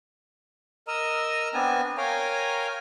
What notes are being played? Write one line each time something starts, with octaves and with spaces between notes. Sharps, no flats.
A#4 D#5 A#5 E6
B3 C4 D4 G#5 A5
A#4 C#5 F5 G5 G#5 A#5